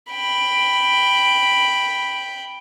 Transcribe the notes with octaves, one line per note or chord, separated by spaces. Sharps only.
G5 B5